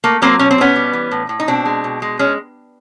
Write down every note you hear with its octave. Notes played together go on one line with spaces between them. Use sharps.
A3 A#3
F#3 A#3 C4
B2 C#4
C4
B2 B3 C#4
G3
E3
A2
A2
D#4
B2 C4 D4
G#3
B2
G#3
G#3 C#4